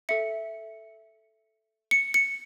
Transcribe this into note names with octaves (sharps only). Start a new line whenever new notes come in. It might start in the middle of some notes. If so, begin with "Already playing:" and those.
A4 E5 C#7
C#7
C#7